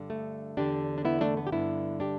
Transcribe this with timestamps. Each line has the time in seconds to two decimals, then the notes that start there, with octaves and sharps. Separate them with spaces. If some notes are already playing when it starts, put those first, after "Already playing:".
Already playing: G2 D3
0.10 A3
0.57 E2 D3 D4 G4
0.98 D4
1.05 B3 E4
1.21 A3 D4
1.37 B3
1.47 G4
1.52 G2 D3 B3 E4
2.00 D4 G4